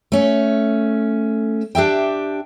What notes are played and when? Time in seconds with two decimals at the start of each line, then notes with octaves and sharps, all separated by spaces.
0.12 A3 C#4
1.75 D4 G4 E5 G5